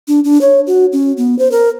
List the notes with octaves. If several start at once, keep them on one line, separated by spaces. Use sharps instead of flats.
D4
D4
C#5
F#4
C#4
B3
C5
A#4